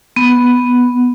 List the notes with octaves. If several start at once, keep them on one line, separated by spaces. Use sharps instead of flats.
B3